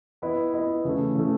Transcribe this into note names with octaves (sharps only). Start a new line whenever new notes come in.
B3 E4 B4 D#5
B3 E4 B4 D#5
C#3 E3 A3
C#3 E3 A3